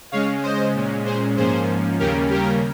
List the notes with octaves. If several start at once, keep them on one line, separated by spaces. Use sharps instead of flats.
C#3 G#3 C#4 C#5 F5
C5 D#5
A#2 G#3 C#4
G#4 C5
G#2 F3 A#3 C#4 G#4 C5
D#2 C#3 G3 A#3 C#4 G4 A#4
G4 A#4